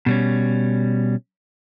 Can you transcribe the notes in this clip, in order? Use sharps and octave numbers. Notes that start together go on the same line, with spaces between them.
B2 G3 C#4